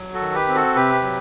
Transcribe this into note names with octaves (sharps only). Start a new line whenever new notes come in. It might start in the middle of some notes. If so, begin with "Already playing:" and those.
Already playing: F#3
F#4 A4
D#3
G4 B4
C4
F#4 A4
C3 G4 B4
F#3